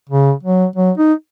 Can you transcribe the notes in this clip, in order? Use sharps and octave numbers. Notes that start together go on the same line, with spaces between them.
C#3
F#3
F#3
D#4